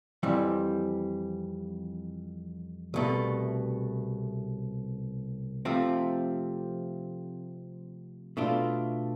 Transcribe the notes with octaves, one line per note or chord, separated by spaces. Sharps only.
F2 E3 G3 C4
C2 B2 A3
C3 F3 A3 C4
B2 A3 D4 F4